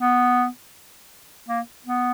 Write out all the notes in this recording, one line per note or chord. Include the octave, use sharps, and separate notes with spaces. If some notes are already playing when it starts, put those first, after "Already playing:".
B3
A#3
B3